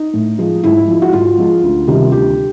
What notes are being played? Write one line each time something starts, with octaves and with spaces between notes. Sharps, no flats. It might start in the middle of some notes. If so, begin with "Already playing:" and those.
Already playing: D#4
A2
F3 G#3
G#2 E4
F3 G#3
F#4
G#2 F4
F3 G#3
D2
C3 D#3 G3
D2 G4